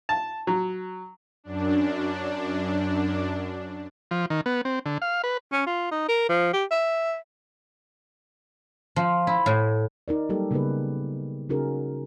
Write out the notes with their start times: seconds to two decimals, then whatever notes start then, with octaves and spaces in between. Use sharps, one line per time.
0.09 A5
0.47 F#3
1.44 F#2 D4
4.11 F3
4.30 D#3
4.46 B3
4.65 C4
4.86 D3
5.02 F5
5.24 B4
5.52 C#4
5.66 F4
5.91 D#4
6.08 A#4
6.29 F3
6.53 G4
6.71 E5
8.96 F3
9.27 E4
9.46 A2
10.08 D#4 A#4 D5
10.29 F#3 G3 A#3 G4 A4 A#4
10.51 C#3 A#3 B3 D#4 G#4 B4
11.49 C#3 C#4 D#4 F#4 G#4 A#4